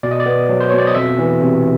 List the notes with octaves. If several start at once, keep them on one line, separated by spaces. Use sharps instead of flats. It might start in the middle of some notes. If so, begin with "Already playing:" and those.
B2 D5
D#5
D5
B3
F#3
C5
B2 C#5
D5
D#5
F2 E5
E3
C3